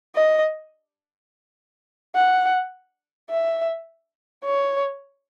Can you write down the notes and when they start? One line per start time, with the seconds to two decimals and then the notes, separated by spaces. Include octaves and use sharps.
0.15 D#5
2.15 F#5
3.30 E5
4.45 C#5